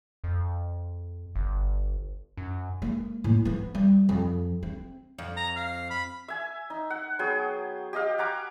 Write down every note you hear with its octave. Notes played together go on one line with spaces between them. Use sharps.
F2
G1
F#2
G#3 A#3
A2
F3 B3
G3
F2
C4
F2
A#5
F5
B5
E5 G#5
D#4
F#5
F#3 B3 G#4 G5
G4 D#5 F5
F#5 G#5 A#5 D6